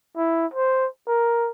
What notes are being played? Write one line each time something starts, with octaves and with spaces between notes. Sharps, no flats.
E4
C5
A#4